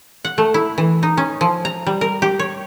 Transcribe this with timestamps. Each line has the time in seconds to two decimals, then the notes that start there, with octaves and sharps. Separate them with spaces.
0.25 F#5
0.38 A3
0.54 E4
0.78 E3
1.03 D#4
1.17 C#4
1.41 F3
1.65 A#5
1.87 G3
2.01 A#4
2.22 G4
2.39 C#5